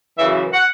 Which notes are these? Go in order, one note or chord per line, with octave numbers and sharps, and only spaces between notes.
F#2 C#3 E3 E5
F#5